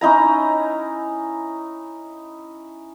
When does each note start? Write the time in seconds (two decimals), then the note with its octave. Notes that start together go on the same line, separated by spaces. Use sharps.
0.01 C#4 D#4 E4 A#5